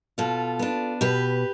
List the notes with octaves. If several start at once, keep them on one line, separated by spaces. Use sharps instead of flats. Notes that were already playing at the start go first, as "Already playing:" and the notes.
B2 F4 A4
B3 D4
B2 G4 B4